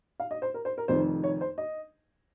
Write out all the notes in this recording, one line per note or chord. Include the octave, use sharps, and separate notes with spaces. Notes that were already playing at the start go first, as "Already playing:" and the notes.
F5
D#5
C5
A#4
C5
A#4
F1 F2 D#3 C5
C#5
C5
D#5